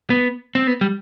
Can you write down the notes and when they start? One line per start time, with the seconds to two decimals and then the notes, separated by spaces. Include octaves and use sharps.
0.10 B3
0.55 C4
0.67 B3
0.81 G3